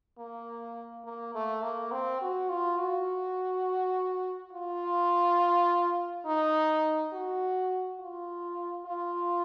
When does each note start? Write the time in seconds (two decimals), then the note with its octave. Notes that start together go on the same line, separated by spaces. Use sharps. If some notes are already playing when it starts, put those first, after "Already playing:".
0.19 A#3
1.05 A#3
1.35 A3
1.63 A#3
1.92 C4
2.21 F#4
2.49 F4
2.79 F#4
4.53 F4
6.26 D#4
7.13 F#4
8.00 F4
8.86 F4